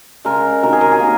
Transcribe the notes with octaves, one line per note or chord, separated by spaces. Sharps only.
C#3 G#3 A#4
C3 D#3 F#3 A#4
G#4
A#4
G#4
D#3 A#3